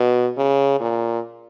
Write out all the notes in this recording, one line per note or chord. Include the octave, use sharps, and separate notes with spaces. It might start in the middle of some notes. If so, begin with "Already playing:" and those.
Already playing: B2
C#3
A#2